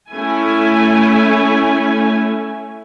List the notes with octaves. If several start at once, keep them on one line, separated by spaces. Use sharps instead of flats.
A3 C#4 E4 G#5